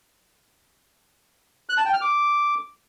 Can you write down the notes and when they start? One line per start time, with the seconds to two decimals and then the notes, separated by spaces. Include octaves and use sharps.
1.69 F#6
1.77 A5
1.85 G5
1.93 F6
2.01 D6